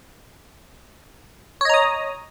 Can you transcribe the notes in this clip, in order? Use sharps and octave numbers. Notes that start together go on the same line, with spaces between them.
C#5 D#5 A#5 D#6